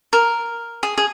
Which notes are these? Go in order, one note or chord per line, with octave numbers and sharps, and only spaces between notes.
A#4
G#4
G#4